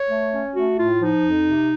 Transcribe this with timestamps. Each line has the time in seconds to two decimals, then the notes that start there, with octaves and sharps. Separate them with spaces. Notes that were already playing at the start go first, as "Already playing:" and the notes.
Already playing: C#5
0.09 A3
0.32 C#4
0.54 A3 F#4
0.77 A2 F4
0.99 F3 D#4
1.22 F2
1.45 C3